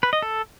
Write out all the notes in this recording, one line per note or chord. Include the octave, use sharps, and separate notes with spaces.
B4
D#5
A4